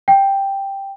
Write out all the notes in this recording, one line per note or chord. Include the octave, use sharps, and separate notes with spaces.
G5